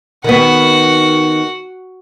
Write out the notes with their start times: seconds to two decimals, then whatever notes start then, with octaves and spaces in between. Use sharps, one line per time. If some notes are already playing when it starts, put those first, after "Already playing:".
0.24 D#3 B3 F#4 F#5